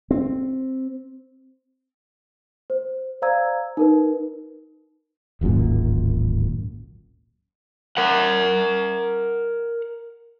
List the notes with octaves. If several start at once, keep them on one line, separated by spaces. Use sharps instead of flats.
C4
C5
C5 D5 F5 A#5 E6 G#6
D#4 A#4 B4
D1 G#1 F#2 A#2
A#4 F#5